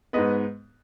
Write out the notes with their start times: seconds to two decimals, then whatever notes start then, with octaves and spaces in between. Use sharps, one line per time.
0.13 G#2 G#3 B3 B4 D#5